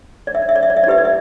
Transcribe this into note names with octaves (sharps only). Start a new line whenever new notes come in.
D5
E5
D5
E5
D5
E5
D5
E5
D5
E4 G4 B4 E5
D5
E5